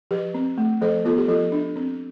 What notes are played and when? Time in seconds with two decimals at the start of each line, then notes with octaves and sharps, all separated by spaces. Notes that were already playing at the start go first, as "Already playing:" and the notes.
0.11 F3 G4 B4
0.34 C4
0.58 A3
0.82 F3 A4 C5
1.05 B3 F4 A4
1.18 G4
1.28 F3 F4 A4
1.52 D4
1.76 C4